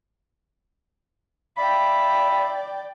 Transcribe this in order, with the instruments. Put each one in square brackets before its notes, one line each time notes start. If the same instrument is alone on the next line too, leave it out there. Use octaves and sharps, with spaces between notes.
[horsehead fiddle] D5 G5 [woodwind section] E5 F5 B5